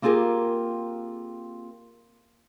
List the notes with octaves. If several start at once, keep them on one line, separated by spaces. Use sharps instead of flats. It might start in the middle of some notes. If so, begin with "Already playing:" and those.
A#3 C4 F4 G4 G#4 A#4